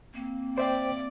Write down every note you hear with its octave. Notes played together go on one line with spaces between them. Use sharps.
A#3 C4
C5 D5 E5 G5